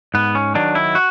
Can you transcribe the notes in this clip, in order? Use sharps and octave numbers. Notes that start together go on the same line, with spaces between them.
G#2 B3
C#4
D#3 F#3 D4
E4
F#4